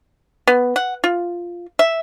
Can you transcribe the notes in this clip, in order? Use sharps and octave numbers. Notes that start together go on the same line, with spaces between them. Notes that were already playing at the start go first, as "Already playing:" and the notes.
B3
F#5
F4
E5